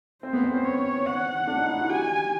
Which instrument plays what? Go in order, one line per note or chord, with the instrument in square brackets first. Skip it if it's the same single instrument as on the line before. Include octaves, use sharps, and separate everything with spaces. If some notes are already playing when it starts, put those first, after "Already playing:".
[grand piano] C4 [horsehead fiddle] C5
[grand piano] B3
C4
C#4
[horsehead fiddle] C#5
F#5
[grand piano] D4
D#4
E4
F#4
[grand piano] G4 [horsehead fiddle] G#5